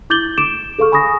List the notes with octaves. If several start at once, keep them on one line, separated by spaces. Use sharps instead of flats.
E4 D6 G6 A6 F#7 G7
D6 D7 E7
G#4 A4 F5 C#6 F6
G#5 B5 C#6 D#6 A#6